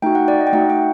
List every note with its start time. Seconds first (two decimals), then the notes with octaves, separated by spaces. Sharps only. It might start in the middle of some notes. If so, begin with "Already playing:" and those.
0.02 A3 D#4 F#4 G5
0.15 F#5
0.28 D5
0.41 D#5
0.47 G5
0.53 A3 D#4 F#4 F#5
0.70 G5